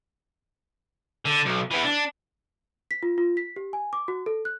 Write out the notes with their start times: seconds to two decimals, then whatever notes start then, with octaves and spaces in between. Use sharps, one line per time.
1.25 D3
1.45 B1
1.71 E3 B3
1.84 D4
2.91 B6
3.03 F4
3.18 F4
3.37 B6
3.56 G4
3.73 G#5
3.93 D6
4.08 F#4
4.26 A4
4.45 F#6